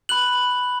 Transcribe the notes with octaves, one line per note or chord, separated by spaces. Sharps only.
B5 F#6 F#7